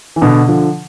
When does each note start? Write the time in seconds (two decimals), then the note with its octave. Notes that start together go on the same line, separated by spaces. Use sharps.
0.16 E3
0.22 B2 D3
0.47 D3 F3